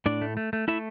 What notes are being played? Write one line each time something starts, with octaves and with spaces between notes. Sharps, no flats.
A2 D4 D5
A3
A3
A3
A3 E4 E5